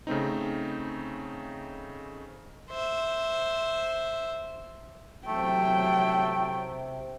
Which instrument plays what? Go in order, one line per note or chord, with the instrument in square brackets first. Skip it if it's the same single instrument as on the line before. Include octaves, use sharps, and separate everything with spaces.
[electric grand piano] C#3 A3 C4 D#4
[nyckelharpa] C5 E5
[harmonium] C3 [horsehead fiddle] F#3 G5 [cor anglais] A3